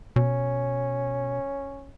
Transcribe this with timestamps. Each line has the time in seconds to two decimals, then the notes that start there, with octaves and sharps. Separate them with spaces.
0.16 B2 C#4